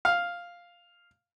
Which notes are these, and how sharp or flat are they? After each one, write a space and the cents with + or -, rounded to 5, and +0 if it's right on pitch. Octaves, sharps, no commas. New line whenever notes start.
F5 +0